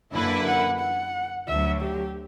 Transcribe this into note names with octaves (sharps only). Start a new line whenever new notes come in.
F#2 D3 A#3 E4 B4
F#5
F#5
D2 D3 F#3 E5
G4